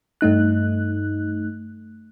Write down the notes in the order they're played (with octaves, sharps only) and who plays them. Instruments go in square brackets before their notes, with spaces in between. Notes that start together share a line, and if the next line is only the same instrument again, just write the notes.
[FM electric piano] G2 A3 D#4 F#6